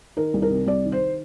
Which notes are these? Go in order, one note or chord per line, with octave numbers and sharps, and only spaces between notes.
D#3 A#4
C2
A#4
C3
C2 D5
D#3
C5